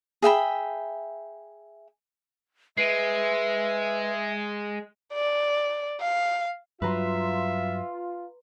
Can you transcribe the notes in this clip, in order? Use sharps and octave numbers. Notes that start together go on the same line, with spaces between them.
G#4 E5 G5 B5
G#3 B4 E5 C7 D7 D#7
D5
F5
G2 F#3 F4 B4 E5 A#5 C6